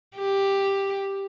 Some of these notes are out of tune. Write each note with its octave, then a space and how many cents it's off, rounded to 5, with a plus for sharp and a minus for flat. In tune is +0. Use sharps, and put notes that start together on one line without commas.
G4 +5